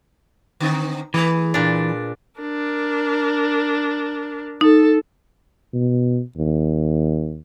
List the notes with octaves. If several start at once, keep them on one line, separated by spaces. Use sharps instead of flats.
D3 C4 D#4
E3 A3 G#4 B4
A#2 D4
D4 A#4
D#4 A4
B2
D#2